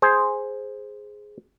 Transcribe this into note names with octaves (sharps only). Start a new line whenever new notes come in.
G#4 C5